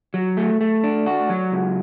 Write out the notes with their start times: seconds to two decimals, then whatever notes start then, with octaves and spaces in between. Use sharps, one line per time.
0.14 F#3
0.37 A3
0.61 A3
0.84 D4
1.06 F#4
1.30 F#3
1.52 C#2